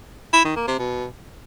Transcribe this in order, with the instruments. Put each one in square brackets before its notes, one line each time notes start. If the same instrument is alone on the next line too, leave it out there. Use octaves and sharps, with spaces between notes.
[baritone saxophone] E4
D#3
A#3
C3
B2